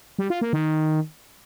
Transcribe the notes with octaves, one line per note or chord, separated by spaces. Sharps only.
G3
F4
A#3
D#3